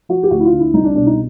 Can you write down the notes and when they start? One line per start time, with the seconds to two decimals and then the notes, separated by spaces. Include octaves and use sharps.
0.09 F3 F#4
0.23 G4
0.31 D2 F#4
0.40 E4
0.45 F4
0.52 D3
0.60 E4
0.74 C2 D#4
0.84 D4
0.95 B2 D4
1.06 D#4